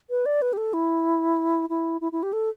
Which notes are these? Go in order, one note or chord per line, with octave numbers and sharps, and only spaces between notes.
B4
D5
B4
G4
A4
E4
E4
E4
E4
G4
A4